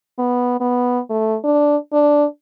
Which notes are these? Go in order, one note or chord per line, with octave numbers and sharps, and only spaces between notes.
B3
B3
A3
D4
D4